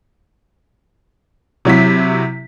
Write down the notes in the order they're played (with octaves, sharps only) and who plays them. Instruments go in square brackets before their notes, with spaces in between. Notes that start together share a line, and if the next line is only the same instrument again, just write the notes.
[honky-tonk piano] C3 F#3 E4 B6